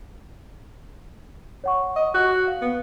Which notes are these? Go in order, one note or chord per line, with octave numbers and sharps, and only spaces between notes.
C#5 F#5 C#6
D#5
F#4
F5
B3